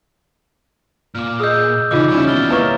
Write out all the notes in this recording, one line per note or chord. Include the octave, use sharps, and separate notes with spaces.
A#2 D6 F6
G#4 D#5 D#6 E6 G6
C#3 E3 D#4 F4 D#5 D6
C#3 G3 C#4 E4 C#5
D#2 B2 F6 A6 G7
A#3 E4 B4 C#5 D#5 A#5 C#6 A6